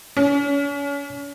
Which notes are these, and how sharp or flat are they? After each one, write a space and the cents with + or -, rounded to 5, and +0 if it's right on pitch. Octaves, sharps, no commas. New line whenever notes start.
C#4 +35